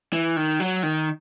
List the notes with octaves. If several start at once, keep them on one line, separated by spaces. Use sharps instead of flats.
E3
D#3
F#3
D#3